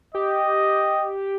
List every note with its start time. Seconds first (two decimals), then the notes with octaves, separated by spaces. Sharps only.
0.15 G4 D#5